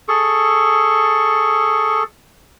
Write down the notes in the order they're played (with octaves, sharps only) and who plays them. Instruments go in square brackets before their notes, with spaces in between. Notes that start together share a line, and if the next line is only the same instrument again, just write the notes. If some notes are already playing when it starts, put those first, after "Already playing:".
[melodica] G#4 A4 C#6